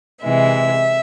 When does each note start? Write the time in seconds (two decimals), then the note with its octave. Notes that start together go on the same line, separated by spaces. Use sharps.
0.25 C3 E3 G#3 E5